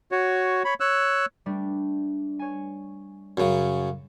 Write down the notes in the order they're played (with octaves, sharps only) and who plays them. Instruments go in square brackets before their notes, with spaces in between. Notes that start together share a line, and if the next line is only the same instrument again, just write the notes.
[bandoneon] F#4 C#5
C#5 B5
C#5 E6 F#6
[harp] G3 A3 D4
C#5 G#5
[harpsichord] F#2 C#3